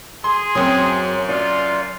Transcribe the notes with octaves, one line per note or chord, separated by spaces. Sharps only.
G#4 C6
F#2 F#3 C4 C6 D#6
F4 D5